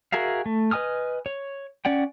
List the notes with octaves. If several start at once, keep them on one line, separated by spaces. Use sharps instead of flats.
F#4 G#4 A#4 E5 F5
A3
B4 D#5 G#5 D#6 F6
C#5
C#4 D5 F#5 G5